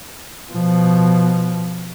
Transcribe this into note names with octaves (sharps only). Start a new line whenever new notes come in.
B2 F3